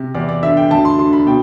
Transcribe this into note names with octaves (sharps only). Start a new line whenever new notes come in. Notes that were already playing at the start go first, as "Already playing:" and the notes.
Already playing: C3
E2 D5
D5
D3 E5
G5
D2 A5
C6
D3 C6
B5
B2 G5